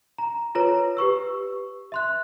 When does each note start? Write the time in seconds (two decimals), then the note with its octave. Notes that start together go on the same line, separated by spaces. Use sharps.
0.18 A#5
0.55 F4 A4 B4 C#5 A#5
0.97 G4 B4 C#6 E6
1.92 E5 C6 F#6